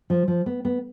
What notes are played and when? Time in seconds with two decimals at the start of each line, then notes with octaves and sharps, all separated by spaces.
0.10 F3
0.28 F3
0.46 B3
0.65 B3